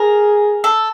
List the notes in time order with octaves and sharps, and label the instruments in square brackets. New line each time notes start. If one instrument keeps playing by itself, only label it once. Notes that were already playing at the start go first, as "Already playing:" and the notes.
Already playing: [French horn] G#4 [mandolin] A#4
[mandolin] A4